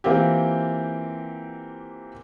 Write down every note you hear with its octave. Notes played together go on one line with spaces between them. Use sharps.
E3 A#3 C4 F4 G4